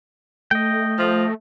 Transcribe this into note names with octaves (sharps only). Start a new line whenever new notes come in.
A3 D#5 G5
F3